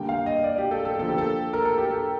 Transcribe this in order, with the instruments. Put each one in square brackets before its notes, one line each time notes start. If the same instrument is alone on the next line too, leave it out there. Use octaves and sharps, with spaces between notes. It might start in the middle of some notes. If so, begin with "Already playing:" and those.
Already playing: [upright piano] D3 G3 A#3 G5
F5
D#5
D5
G4
A4
A4
D3 F3 A#3 A4
G4
A4
A#4
A4
G4
A4